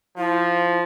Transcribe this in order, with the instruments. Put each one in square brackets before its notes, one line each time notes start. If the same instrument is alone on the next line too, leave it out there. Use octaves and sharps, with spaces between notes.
[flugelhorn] F3 [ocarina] E4